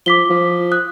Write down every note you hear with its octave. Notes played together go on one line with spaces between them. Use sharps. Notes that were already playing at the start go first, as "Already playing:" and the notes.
F3 D6 B6 G7
F3
D#6 F#6